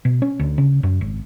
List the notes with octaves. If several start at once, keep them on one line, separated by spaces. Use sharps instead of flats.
B2
C#4
D2
C#3
F#2
G#1